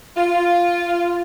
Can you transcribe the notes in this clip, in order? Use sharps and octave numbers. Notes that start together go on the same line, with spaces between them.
F4